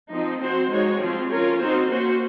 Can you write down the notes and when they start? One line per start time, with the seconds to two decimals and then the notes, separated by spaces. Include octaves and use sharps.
0.11 F3 C4 D#4
0.41 C4 F#4 C5
0.70 G#3 D#4 F#4 C#5
1.00 F3 C4 F4
1.29 C#4 F4 A#4 C#5
1.59 C4 D#4 F#4 C5
1.88 A#3 C#4 F#4 C5